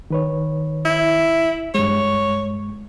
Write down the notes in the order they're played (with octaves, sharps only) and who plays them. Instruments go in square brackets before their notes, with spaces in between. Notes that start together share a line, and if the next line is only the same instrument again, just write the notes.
[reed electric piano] D#3 B4 C#5
[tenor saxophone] E4
[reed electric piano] G2 G#3 [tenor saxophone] C#5